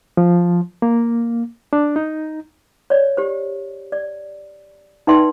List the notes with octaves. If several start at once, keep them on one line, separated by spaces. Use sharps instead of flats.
F3
A#3
D4
D#4
C#5 D5
G4 C5
D5
D#4 B4 D5 E5 G5 C6